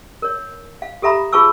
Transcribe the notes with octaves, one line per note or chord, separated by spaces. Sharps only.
A#4 C#5
F5
G4 A4 E5 A#5 B5
F4 G#4 B4 A5 C#6 E6